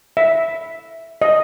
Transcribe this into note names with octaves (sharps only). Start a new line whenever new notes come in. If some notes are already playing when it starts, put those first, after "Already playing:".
E5
D#5